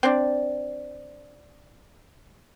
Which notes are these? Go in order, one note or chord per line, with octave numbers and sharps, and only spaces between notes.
C4 D4